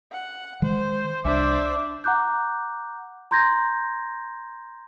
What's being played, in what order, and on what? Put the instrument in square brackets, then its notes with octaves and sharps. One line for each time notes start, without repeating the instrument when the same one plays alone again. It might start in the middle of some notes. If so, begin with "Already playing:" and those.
[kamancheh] F#5
[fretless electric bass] D#3 G#3 [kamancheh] C5
[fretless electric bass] C2 [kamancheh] D4 C5 [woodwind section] E5 D6
[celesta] F#5 A#5 D6 F#6 G6
A#5 C6 G6 G#6 A#6